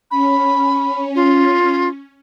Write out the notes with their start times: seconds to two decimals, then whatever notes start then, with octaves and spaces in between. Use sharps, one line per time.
0.11 C#4 B5
1.15 F4